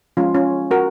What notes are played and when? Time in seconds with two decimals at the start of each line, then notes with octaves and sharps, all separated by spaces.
0.17 F3 G#3 C#4 F4
0.35 C#4 F4
0.71 F#4 A#4